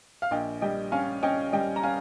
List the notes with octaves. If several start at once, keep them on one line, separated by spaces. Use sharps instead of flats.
F5
A#1 D#5 G5
G3 D#5 G5
C#4 F5 G#5
C#4 D#5 G5
G3 D#5 G5
A#5
C#4 F5 G#5